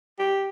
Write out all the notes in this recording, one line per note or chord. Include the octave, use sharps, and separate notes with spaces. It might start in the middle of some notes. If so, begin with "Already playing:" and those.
G4